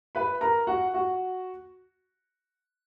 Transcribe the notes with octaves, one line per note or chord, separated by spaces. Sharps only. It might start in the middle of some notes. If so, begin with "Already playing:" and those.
B4 B5
A#4 A#5
F#4 F#5
F#4 F#5